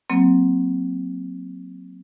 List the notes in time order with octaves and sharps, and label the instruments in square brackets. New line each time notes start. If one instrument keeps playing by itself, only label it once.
[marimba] F#3 A#3 C4